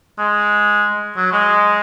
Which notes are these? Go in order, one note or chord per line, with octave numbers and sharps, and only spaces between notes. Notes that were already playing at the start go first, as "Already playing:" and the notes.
G#3
F#3
G#3